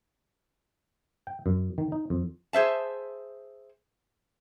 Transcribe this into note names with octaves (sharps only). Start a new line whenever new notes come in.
G5
F#2
D#3
D#4
F2
G#4 C5 E5 A5